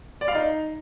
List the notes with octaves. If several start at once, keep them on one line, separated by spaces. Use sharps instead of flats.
D5
F5
D#4